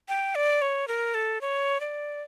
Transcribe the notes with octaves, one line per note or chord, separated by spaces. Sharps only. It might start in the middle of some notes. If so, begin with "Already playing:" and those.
G5
D5
C#5
A#4
A4
C#5
D5